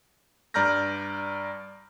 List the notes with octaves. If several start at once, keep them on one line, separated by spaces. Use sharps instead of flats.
G2 D5 A#5 F6 G6 A#6